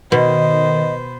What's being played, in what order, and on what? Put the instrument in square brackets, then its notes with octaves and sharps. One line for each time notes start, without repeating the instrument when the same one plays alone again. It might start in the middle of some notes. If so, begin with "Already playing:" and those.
[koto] B2 [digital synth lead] D#3 [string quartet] B3 B4 C5 [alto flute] D#5